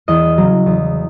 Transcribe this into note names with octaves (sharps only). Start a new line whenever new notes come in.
E2 D#5
C#3 F#3
E2